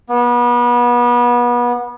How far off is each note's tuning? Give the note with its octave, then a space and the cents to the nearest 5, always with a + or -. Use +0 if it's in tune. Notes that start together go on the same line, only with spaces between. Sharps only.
B3 -30